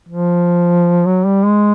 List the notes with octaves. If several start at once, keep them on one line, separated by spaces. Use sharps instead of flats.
F3
F#3
G3
G#3